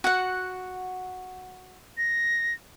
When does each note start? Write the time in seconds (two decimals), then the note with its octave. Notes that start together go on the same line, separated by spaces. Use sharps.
0.04 F#4 F#5
1.97 A#6